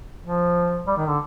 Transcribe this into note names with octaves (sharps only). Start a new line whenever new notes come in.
F3
G3
D#3
D3